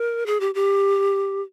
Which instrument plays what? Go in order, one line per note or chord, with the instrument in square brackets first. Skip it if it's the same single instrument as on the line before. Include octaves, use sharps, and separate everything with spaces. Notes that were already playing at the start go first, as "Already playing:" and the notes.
Already playing: [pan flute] A#4
G#4
G4
G4